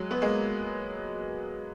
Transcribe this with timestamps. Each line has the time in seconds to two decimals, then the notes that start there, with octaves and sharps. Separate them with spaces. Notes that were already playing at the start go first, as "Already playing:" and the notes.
Already playing: F#3 G#3
0.11 B3
0.22 G#3 A#3